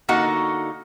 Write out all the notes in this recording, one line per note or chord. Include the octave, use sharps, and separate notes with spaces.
D3 A#3 D#4 F#4 F#5